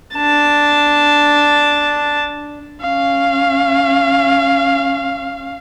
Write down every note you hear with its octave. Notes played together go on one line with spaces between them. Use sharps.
D4 A5
C#4 F5